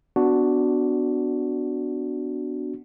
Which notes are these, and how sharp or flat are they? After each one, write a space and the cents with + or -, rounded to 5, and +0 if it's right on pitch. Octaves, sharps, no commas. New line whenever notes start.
B3 +20 D4 +0 F#4 +0